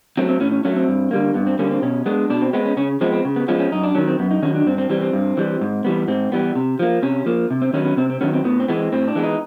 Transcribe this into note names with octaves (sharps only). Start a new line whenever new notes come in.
F#3 A3 C4
C4
A2 C#4
C#4
F#3 A3 C#4
C4
G2
D3 G3 A#3
G2 B3
C4
D3 G3 A#3 C#4
C4
B2 C#4
G#3 B3 D4
B2 D4
C4
G#3 B3 C4
C#4
C#3 C#4
F3 G#3 B3 C4
C4
C#3
B3
F3 G#3 B3 C#4
C#4
F#2 D#4
D4
D#3 F#3 C#4
C4
F#2 B3
D#4
D#3 F#3 C#4
D4
G2 C4
C4
E3 G3 C4
C4
G2
E3 G3
G#2
E3 G3 B3
G#2 C4
E3 G3 B3
C3
F3 A#3
C3 C#4
F3 A#3
C3
C4
D#3 F#3 B3 C#4
C#4
C3 C4
C4
D#3 F#3 B3 C#4
C4
A2 B3
C4
E3 G#3 B3
C4
A2 C4
D4
E3 G#3 B3
D#4